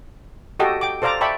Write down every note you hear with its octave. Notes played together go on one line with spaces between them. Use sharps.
F#4 G4 A4 D#5 G5
G5 D6
A4 C5 D5 F5 A#5 D6
D5 E5 G5 A5 B5 C#6